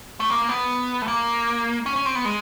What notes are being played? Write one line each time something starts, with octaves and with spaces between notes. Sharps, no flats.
A3
A#3
B3
A3
A#3
C#4
C#4
C4
B3
G#3